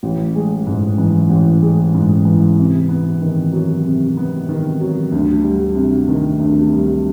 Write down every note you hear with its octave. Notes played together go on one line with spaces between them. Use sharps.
A1
G#3
G#2
E3
A1
G#3
G#2
E3
C3
B3
D#3
F#3
C3
B3
D#3
F#3
D2
G3
C3
D#3
D2
G3